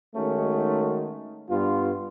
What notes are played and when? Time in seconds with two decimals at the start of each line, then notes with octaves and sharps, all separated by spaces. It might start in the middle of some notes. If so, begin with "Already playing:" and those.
0.15 D#3 G#3 A3 C#4 D#4 F#4
1.50 G2 B3 F4